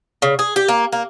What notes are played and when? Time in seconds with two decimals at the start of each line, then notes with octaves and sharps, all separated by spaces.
0.22 C#3
0.39 G#4
0.56 G4
0.68 A#3
0.92 A#3